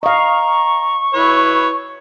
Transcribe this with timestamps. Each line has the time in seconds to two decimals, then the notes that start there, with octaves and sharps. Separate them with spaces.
0.03 D#5 F5 A#5 C#6
1.14 E4 B4 C#5